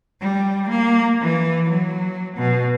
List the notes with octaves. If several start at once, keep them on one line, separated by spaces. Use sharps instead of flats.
G3
A#3
E3
F#3
B2